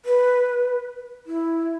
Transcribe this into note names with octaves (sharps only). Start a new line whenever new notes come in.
B4
E4